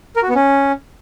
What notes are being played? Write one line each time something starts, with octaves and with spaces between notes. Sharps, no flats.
A#4
F#4
B3
C#4